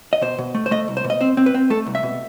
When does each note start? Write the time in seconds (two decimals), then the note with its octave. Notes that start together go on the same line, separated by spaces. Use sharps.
0.13 D#5
0.22 B2 C5
0.38 B2
0.55 A3
0.66 C5
0.71 A3 D#5
0.88 C2
0.97 C5
1.04 B2
1.10 D#5
1.21 C4 C5
1.37 C4
1.46 B4
1.54 C4
1.70 A3 A4
1.87 C2
1.95 E5
2.03 B2